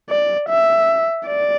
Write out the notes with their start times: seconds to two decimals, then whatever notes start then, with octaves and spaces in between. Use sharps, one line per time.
0.10 D5
0.49 E5
1.27 D5